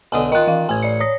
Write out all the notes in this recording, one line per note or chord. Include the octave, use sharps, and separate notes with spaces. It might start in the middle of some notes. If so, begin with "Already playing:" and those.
B1 D3 D#5 G#5 D#6
D#3 F4 D#5 F#6
E3 F5
A1 G#5 G#6
D5 C#7
C#5 D#6 A#6